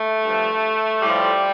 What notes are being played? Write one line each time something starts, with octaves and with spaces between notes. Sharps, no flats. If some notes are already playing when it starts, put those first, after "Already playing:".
Already playing: A3
G2 F3
A2 F3 G3